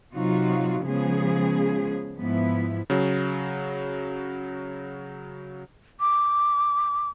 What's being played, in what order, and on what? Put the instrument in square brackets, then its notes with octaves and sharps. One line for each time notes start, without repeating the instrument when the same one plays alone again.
[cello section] C3 F#3 D#4 F4 F#4
C#3 F3 G#3 B3 G#4
G#2 F3 B3 E4
[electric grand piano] C#3 F#3
[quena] D6